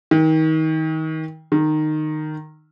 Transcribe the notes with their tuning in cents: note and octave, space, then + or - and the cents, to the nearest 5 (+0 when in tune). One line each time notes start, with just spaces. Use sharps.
D#3 +30
D#3 -15